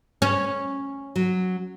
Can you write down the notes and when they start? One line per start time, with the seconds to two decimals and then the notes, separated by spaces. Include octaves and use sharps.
0.22 C#4
1.16 F#3